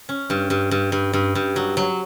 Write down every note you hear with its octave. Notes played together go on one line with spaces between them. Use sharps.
C#4
G2
G2
G2
G2
G2
G2
F#3
F#3